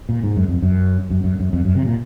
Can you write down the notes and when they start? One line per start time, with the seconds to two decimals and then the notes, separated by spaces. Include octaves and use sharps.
0.09 A#2
0.24 G#2
0.36 F#2
0.48 F2
0.62 F#2
1.10 F#2
1.24 F#2
1.40 F#2
1.53 F2
1.65 F#2
1.75 C3
1.86 A#2